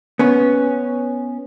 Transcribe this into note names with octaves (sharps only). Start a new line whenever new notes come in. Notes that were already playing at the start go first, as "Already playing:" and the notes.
B3 C#4